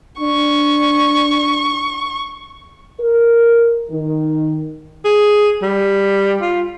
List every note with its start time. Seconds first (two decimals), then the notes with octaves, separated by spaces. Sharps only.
0.21 D4 C#6
3.00 A#4
3.91 D#3
5.05 G#4
5.62 G3
6.41 F4